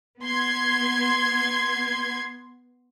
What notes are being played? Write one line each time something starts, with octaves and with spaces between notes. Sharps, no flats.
B3 C6 G#6